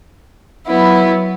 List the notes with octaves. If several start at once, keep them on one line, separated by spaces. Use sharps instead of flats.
F#3 B3 E4